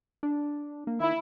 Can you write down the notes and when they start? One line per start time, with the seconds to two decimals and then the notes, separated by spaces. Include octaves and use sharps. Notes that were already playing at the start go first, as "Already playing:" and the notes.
0.23 D4
0.87 A#3
1.00 D#3 E4